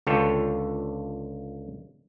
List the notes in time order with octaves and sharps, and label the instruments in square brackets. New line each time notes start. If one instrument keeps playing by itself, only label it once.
[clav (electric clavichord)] C#2 D3 F4 A4 C#5 G5